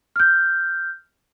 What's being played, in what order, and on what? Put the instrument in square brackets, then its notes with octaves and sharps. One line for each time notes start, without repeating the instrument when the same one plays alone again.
[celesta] F6 G6